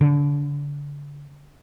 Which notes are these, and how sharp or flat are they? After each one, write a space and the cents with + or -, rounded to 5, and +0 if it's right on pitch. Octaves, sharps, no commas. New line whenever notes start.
D3 -30